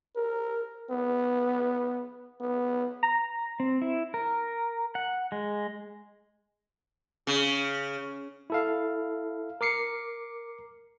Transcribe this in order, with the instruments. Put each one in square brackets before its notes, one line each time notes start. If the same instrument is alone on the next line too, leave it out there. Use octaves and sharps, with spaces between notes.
[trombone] A#4
B3
B3
[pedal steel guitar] A#5
C4
E4
A#4
F#5
G#3
[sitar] C#3
[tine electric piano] E4 A4 F5
A#4 D6 C7 C#7